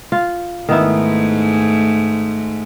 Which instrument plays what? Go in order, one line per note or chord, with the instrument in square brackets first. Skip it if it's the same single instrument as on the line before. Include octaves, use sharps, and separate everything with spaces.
[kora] F4
[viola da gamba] G#2 G#3 A3 [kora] D#3 B3 E4